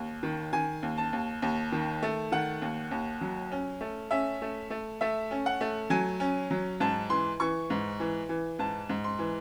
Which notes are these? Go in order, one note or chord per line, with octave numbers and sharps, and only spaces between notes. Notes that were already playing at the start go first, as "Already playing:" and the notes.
Already playing: D#2
D#3
D#3 G#5
D#2
A5
D#2
D#2
D#3
A3
D#3 F#5
D#2
D#2
F#3
C#4
A3
C#4 E5
A3
A3
A3 E5
C#4
F#5
A3
F#3 G#5
C#4
F#3
G#2 A5
E3 C6
E3 C#6
G#2
E3
E3
G#2 A5
G#2
C6
E3